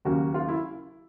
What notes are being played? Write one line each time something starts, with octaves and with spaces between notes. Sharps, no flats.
D#2 C#3 F#3 A#3 C#4 F#4
F4
E4